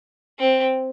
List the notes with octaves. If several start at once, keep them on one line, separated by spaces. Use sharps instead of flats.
C4